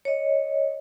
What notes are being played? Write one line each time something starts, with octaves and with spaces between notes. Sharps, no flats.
C#5 D#5